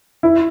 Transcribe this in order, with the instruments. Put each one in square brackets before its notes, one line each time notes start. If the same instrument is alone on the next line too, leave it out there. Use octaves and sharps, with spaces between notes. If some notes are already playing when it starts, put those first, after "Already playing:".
[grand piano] E4